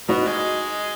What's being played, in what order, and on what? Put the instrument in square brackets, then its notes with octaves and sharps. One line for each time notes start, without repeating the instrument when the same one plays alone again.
[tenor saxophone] B2 [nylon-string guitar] D#4 F#4
[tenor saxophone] G#3